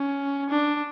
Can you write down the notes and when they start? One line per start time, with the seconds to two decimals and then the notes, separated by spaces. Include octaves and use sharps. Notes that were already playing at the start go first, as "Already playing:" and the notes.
Already playing: C#4
0.50 D4